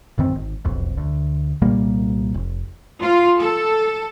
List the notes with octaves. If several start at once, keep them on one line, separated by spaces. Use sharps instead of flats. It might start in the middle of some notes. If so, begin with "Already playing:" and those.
A1 F#2 D#3 C4
G#1
E1 B1 F2
D2
C2 A#2 G3 A#3
F1
F4
A4